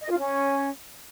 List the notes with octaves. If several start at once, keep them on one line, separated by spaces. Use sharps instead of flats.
D#5
F4
C#4